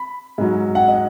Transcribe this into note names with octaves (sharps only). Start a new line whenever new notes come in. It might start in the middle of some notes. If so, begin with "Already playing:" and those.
Already playing: B5
G#2 F#3
F#5
D#5